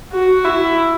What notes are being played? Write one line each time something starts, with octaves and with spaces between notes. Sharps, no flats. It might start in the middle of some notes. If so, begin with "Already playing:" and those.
F#4
E4